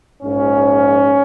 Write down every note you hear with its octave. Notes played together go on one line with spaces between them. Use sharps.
A#1 G#2 F3 C#4